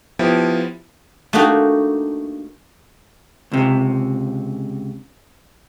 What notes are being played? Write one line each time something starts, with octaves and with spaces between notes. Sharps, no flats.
F3 B3 E4 G4
A3 A#3 D4 D#4 F#4 G4
C#2 C3